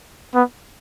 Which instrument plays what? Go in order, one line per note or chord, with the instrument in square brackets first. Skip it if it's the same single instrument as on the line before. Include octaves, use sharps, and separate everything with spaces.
[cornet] B3